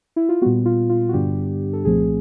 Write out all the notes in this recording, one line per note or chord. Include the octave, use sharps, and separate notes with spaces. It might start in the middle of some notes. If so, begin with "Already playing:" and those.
E4
F4
A#2 G3 B3 F#4
F4
F4
F#4
G2 D3 G3 B3 D4 G4
A4
C2 A#2 F3 A3 C4 G#4